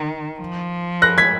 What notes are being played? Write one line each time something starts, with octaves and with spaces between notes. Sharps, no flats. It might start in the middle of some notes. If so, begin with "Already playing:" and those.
Already playing: D#3
F3
F#6 A#6
G#6 B6